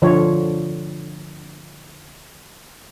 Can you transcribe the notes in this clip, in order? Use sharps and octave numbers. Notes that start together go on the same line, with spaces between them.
D3 F3 F4 C#5